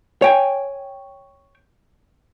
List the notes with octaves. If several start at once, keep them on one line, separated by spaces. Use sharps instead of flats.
C#5 G5 G#5